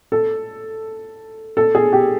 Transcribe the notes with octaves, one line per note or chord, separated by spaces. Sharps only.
A4
A4
G#4
G4